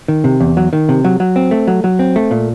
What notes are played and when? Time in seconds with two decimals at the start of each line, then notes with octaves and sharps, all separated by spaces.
0.08 D#3
0.24 C3
0.41 E2
0.57 F#3
0.73 D#3
0.89 C3
1.05 F#3
1.20 F#3
1.36 C4
1.51 A3
1.68 F#3
1.84 F#3
1.99 C4
2.16 A3
2.31 A#2